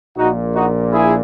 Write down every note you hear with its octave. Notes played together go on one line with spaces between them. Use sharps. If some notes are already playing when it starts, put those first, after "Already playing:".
A#1 A#2 D#4 F#4
D#4 F#4
E4 G#4